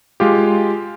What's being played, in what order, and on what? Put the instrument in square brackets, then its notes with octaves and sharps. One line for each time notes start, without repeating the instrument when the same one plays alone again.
[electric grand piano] G#3 F4 G4